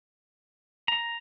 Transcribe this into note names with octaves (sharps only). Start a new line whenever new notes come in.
A#5